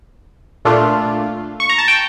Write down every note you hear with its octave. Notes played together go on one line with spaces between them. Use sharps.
A#2 A3 D4 F4
C#6
A#5
A5
G5